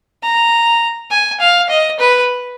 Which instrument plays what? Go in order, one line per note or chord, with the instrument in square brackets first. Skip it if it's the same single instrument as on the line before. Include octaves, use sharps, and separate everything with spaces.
[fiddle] A#5
G#5
F5
D#5
B4